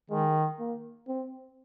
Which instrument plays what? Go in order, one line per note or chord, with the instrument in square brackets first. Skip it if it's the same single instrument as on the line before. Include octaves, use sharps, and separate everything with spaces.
[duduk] D#3 [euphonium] G#3
[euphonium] A#3
C4